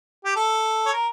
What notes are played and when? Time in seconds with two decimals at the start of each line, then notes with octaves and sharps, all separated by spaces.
0.25 G4
0.36 A4
0.86 C#5
0.93 A#4